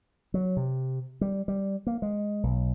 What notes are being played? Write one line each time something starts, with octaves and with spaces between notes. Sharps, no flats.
F#3
C3
G3
G3
A#3
G#3
B1